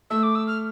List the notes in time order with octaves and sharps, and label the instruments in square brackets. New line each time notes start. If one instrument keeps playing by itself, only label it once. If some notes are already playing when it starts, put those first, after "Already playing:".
[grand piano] A3 [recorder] E6
[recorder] D6
E6
F6